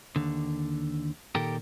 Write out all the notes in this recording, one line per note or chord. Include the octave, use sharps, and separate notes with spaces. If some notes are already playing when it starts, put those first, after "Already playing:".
D#2 D3
A#2 D#3 G4 A4 A#4